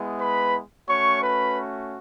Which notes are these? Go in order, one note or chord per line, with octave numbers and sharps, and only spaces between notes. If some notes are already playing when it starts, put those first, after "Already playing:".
Already playing: G#3 B3 E4
B4 B5
A3 C#4 F#4 C#5 C#6
B4 B5